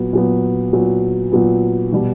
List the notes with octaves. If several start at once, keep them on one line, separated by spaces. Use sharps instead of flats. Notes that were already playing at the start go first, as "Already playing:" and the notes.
Already playing: A#2 F#3 B3
A#2 F#3 B3
A#2 F#3 B3
A#2 F#3 B3
B2 G3